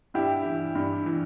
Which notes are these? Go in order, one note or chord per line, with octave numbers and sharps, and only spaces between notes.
G2 E4 G4
E3
G2
E3